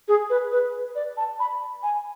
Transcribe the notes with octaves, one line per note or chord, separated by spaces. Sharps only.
G#4
B4
B4
D5
A5
B5
G#5